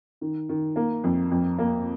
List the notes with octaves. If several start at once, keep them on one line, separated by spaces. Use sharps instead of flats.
D#3
D#3
A#3
F2
F2
A#3